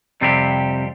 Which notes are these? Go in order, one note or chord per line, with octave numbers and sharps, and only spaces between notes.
F2 C3 G3 C4 G4